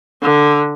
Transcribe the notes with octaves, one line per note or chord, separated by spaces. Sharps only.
D3